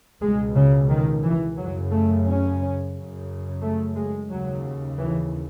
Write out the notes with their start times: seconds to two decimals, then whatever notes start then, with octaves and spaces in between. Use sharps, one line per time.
0.21 C#2 B2 G#3
0.55 C#3
0.89 D#3
1.23 E3
1.57 F#2 C#3 F#3
1.91 A3
2.25 C#4
2.93 F#2 C#3
3.61 A3
3.95 G#3
4.29 D#2 C#3 F#3
4.98 E3